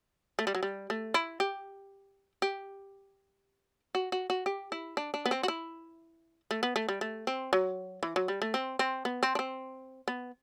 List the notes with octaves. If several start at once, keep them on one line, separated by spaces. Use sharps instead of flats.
A3
G3
F#3
G3
A3
E4
G4
G4
F#4
F#4
F#4
G4
E4
D4
D4
B3
C4
F#4
E4
A3
B3
A3
G3
A3
C4
F#3
E3
F#3
G3
A3
C4
C4
B3
C4
D4
C4
B3